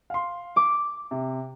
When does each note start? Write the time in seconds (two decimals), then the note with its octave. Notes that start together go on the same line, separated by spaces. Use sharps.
0.10 F5 C6
0.56 D6
1.11 C3